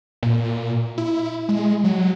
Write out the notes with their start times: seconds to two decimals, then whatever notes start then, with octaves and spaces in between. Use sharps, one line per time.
0.23 A#2
0.98 E4
1.49 G#3
1.84 F#3